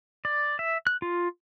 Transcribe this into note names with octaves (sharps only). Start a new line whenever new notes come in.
D5
E5
F#6
F4